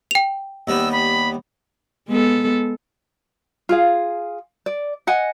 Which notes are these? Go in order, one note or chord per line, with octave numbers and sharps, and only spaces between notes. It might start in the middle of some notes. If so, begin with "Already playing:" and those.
G5 F7
D#2 G3 B3 E6
B5
G#3 B3 A4
F4 G#4 F5
D5
D#5 F#5 G#5